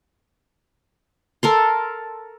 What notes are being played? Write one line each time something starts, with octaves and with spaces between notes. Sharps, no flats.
A4 A#4 C6